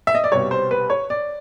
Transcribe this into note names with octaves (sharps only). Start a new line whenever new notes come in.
E5
D#5
D5
C2 B2 G3 C#5
C5
B4
C#5
D5